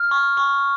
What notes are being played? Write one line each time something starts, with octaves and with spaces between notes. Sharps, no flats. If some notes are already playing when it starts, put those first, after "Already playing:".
Already playing: F6
C#6
C#6